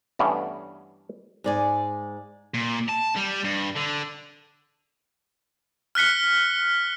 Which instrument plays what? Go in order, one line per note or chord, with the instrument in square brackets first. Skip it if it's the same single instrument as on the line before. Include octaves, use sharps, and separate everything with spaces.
[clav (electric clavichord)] G2 E3 A3 B3 C#4
[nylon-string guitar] G#2 D5 G#5
[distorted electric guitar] A#2
A5
G3
G2
D3
[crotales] F6 F#6 B6 C#7